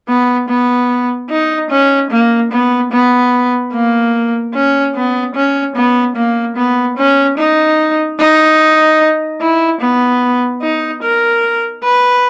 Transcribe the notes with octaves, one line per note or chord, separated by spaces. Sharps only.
B3
B3
D#4
C#4
A#3
B3
B3
A#3
C#4
B3
C#4
B3
A#3
B3
C#4
D#4
D#4
E4
B3
D#4
A#4
B4